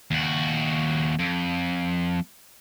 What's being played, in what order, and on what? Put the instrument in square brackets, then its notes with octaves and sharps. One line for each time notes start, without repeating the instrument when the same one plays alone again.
[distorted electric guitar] D#2 F#4
F2